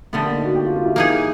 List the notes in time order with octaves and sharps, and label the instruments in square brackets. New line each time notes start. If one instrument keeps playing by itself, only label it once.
[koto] D3 G3 B3 [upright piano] A3
[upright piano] A#3
D#4
F#4
G4
F4
F4
E4
[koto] A#3 D#4 G#4